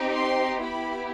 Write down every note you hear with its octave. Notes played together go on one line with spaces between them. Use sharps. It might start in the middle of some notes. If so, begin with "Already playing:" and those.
Already playing: C4 D#4 G4
C6
B3 E4 G4 B5